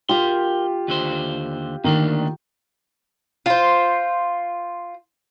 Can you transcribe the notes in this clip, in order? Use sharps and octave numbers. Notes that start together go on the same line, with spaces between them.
F4 G4 A#4 C6
D#2 D3 C5
D2 D#3 A#3 D4
F4 C5